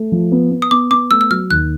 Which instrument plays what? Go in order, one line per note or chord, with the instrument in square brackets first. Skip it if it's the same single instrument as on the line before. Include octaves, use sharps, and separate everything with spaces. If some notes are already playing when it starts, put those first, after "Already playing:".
Already playing: [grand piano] A3
F3
B3
B3
[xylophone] D#6
[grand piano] B3 [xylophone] D6
[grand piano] B3 [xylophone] D6
[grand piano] A3 [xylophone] E6
[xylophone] E6
[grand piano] F#3 [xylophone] F6
[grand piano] D#2 [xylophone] F#6